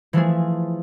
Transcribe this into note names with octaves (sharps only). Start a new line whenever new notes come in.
E3 F3 A3 G#4